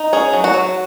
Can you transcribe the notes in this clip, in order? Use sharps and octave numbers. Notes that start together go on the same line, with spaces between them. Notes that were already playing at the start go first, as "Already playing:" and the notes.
Already playing: D#4
C#4 G#4
F#3
F#4
F#3